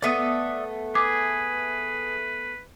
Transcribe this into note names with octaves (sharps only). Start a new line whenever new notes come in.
A3 B3 D5 E5 D#6
G#4 B4 D6